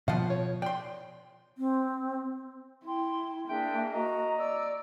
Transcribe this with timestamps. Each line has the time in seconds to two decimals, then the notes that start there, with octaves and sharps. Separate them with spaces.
0.08 B2 F3 F5 F#5
0.30 C#5
0.62 D5 G5 C6
1.58 C4
2.85 E4 G5 C6
3.48 A#3 D4 G#4 E5 G5
3.93 F#4 D#5 A#5
4.39 D5 E6